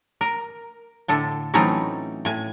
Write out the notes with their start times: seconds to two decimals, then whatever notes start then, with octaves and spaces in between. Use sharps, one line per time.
0.21 A#4
1.08 A2 D3 A4
1.54 E3 F#3 A3 C4 C#4 D#4
2.25 A2 G#5